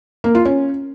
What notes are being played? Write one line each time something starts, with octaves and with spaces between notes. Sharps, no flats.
A#3
F4
C#4